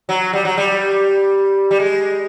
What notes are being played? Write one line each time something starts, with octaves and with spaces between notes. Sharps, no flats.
F#3
G3
F#3
G3
G3
G#3